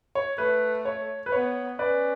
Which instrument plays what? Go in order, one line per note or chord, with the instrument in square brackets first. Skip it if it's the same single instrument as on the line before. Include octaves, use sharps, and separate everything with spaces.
[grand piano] C#5
[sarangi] A3 [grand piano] B4
[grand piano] C#5
B4
[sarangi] B3 [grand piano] C#5
[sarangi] C#4 [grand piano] B4 D5